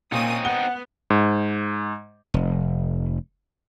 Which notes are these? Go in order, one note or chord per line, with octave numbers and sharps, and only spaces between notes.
A#2 C4 C#4 D#4 D#6
B3 F#5 G7
G#2
F1